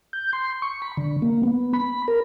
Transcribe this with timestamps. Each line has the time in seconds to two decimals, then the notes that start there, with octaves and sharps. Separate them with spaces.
0.13 G6
0.33 C6
0.62 C#6
0.82 B5
0.97 D3
1.22 A#3
1.43 B3
1.73 B5
2.08 A#4